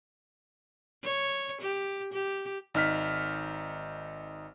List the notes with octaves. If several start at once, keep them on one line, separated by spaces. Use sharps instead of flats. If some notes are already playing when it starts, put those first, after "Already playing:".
C#5
G4
G4
G#1 D#4 F6 B6